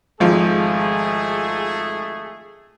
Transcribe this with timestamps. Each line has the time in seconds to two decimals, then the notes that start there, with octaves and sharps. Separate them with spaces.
0.20 G#1 F3 A3 G#4